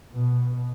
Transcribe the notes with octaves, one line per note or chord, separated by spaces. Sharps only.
B2